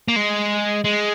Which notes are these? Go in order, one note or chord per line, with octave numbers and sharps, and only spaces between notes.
A#3
G#3
G#3